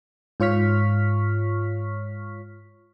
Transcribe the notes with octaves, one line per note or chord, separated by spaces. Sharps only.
G#2 F4 C#5 C#6 F6 B6